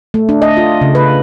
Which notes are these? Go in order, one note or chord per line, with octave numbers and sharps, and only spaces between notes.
A3
D4
D#5
F4
C#3
B4